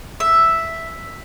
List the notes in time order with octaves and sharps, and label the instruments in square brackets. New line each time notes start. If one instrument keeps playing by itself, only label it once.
[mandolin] E5